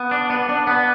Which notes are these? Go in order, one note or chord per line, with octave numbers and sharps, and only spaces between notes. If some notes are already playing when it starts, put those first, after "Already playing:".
Already playing: B3
D4
B3
D4
B3